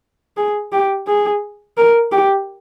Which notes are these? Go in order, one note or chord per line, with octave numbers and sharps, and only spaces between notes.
G#4
G4
G#4
A#4
G4